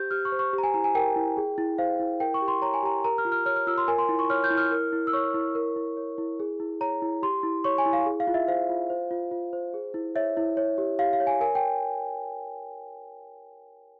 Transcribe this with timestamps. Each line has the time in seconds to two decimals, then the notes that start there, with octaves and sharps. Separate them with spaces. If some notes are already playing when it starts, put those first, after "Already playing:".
Already playing: G4 C5 G6
0.11 G4 F6
0.25 C#6
0.32 C5
0.39 C#6
0.53 G4
0.58 A#5
0.63 G#5
0.74 E4 A#5
0.84 G#5
0.95 A#4 G5
1.16 E4
1.37 G#4
1.58 E4
1.78 C5 F5
2.00 E4
2.20 A#4 G5
2.34 C#6
2.41 G4
2.48 C6
2.62 C#5 A#5
2.74 G#5
2.83 G4 A#5
3.04 A#4 A#5
3.18 F6
3.25 F4
3.32 F6
3.46 C#5 F6
3.56 F6
3.67 F4 E6
3.78 C6
3.88 A#4 G#5
3.98 C6
4.09 E4
4.19 C#6
4.30 C#5 F6
4.44 G6
4.51 E4
4.57 F6
4.71 A#4
4.92 E4
5.07 E6
5.13 C#5 C#6
5.34 E4
5.55 A#4
5.76 E4
5.97 C#5
6.18 E4
6.40 G#4
6.60 E4
6.81 C#5 A#5
7.02 E4
7.23 G4 C6
7.43 E4
7.64 C#5 C#6
7.78 G#5
7.86 E4
7.93 F5
8.06 G#4
8.20 F5
8.27 F4
8.34 E5
8.48 C5 F5
8.69 F4
8.90 C5
9.11 F4
9.32 F4
9.53 C5
9.74 G#4
9.94 E4
10.15 C#5 E5
10.37 E4
10.57 C#5
10.78 G4
10.99 G4 F5
11.13 F5
11.20 C#5
11.27 G#5
11.41 A#4 G#5
11.55 G5